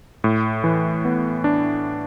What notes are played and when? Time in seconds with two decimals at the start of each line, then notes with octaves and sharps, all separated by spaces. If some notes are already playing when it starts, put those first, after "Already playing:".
0.24 A2
0.64 E3
1.05 B3
1.44 D4